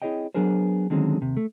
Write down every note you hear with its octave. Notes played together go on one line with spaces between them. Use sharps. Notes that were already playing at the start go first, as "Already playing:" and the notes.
C4 E4 G#4 C#5 D#5 G5
F#3 B3 D4 G#4 A#4 C5
D3 D#3 F#3 G#3 C4 C#4
D#2 C3
A3